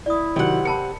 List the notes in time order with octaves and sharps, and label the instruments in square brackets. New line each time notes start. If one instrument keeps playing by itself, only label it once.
[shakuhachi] E4 [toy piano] D5 D#6
[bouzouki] C3 F#5 [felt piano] D#3 F#3
[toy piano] A#4 A5 B5 [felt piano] C#7